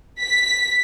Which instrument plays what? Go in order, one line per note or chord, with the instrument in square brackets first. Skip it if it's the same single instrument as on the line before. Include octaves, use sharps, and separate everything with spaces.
[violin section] B6